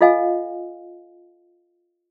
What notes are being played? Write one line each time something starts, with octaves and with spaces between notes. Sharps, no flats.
F4 A4 D#5 F5 G#5